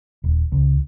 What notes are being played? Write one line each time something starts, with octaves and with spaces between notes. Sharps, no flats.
D#1
C#2